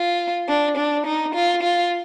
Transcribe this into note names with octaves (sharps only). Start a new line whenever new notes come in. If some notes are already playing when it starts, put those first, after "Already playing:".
Already playing: F4
D4
D4
D#4
F4
F4